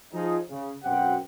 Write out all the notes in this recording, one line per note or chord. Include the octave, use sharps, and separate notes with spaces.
F3 D#4 G#4
C#3
F#2 B2 C4 G4 F#5 G5